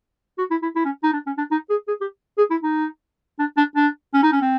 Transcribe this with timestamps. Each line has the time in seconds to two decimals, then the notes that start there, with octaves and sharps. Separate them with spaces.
0.38 F#4
0.51 E4
0.63 E4
0.76 E4
0.85 C#4
1.03 D#4
1.13 D4
1.26 C#4
1.38 D4
1.51 D#4
1.70 G#4
1.88 G#4
2.01 G4
2.38 G#4
2.51 E4
2.63 D#4
3.39 D4
3.57 D4
3.76 D4
4.14 C#4
4.23 D#4
4.32 C#4
4.41 C4